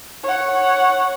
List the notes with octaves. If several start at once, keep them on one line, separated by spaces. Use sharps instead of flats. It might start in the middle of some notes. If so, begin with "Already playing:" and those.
C#5 F#5